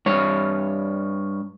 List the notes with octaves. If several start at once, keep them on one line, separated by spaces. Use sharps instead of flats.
G2 C#5